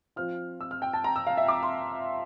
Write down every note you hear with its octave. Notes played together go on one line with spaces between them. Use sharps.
F3 C4 F4 F6
E6
F6
G5
A5
A#5
E6
F5
E5
D6
C6